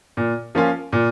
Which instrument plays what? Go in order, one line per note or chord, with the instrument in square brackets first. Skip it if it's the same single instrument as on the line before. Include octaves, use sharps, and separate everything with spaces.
[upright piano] A#2
F3 A#3 C#4 F4
A#2